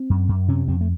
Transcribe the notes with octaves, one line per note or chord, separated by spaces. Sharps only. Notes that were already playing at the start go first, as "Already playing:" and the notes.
Already playing: C4
F#2
F#2
C3 C#4
F2 C4
A3